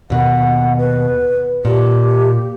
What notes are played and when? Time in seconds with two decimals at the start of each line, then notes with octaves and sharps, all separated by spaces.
0.10 D#2 B2 F#5
0.78 B4
1.65 A#2 G4